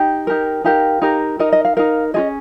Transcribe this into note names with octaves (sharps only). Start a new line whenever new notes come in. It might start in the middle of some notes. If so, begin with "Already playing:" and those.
Already playing: D#4 G4 G5
D#4 G4 A#4
D#4 G4 A#4 F5
D#4 G4 A#4
D#4 A#4 D#5
D#5
F5
D#4 A#4 F5
C#4 F4 G#4 D#5